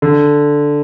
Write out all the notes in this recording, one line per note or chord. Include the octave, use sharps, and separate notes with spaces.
D3